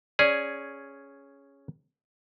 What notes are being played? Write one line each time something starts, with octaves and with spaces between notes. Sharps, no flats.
C#4 G#4 D5